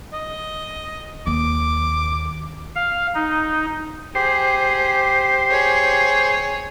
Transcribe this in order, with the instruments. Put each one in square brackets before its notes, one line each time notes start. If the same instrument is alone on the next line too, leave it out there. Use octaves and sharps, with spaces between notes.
[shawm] D#5
[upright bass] D#2 [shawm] D6
[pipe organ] F5
D#4
[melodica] G4 [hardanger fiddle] G#4 [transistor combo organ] C5
[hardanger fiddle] G#4 C#5